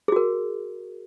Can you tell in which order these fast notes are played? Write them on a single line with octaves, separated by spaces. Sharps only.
G#4 F#4 A#4